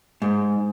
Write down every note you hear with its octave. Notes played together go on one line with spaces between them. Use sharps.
G#2